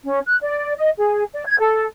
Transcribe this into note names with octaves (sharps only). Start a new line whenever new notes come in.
C#4
F#6
D5
D#5
G#4
D5
G#6
A4